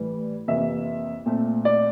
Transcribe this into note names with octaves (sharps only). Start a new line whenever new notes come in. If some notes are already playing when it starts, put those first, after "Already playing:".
Already playing: A2 E3 G3
F2 C3 E3 A#3 E5
A#2 A3 C4
D5